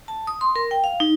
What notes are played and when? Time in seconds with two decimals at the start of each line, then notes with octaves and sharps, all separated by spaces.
0.08 A5
0.27 D#6
0.41 C6
0.56 A#4
0.71 G5
0.84 F5
1.00 D#4